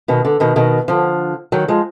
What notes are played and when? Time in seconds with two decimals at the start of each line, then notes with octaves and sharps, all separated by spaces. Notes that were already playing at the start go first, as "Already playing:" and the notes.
0.08 B2 D#3
0.25 D3
0.40 B2 D#3
0.56 B2 D#3
0.88 D3 F3
1.52 D#3 F#3
1.68 F3 G#3